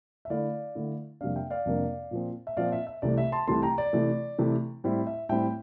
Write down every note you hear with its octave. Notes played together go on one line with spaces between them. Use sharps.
E5
D3 A3 E4 D5 F5
D3 A3 E4
F2 C3 G3 A#3 D4 D5 F5
E5 G5
D5 F5
F2 C3 G3 A#3 D4
A#2 F3 C4
E5
A#2 F3 C4 D5 F5
E5
E5
C2 C3 E3 A3 D5
E5
A5 C6
C2 C3 E3 A3 A5 C6
G5 A#5
D5
C3 E3 A3
C3 E3 A3
A2 G3 C4 E4
E5
A2 G3 C4 E4 E5 G5